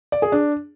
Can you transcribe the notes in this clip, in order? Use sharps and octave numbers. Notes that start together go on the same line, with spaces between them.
D5
G#4
D4